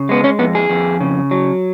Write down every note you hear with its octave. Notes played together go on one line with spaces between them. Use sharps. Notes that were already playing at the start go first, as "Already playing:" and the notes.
Already playing: C#3
G#3 B3
C#4
F2 B3
G#4
F2
C#3
F#3